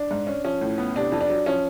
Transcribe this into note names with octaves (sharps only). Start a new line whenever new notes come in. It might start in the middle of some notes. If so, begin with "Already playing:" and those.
Already playing: D4
G#2
C#4
F3 C#4
A2
B3
C3 D4
F2
D4
F#3
F3 C#4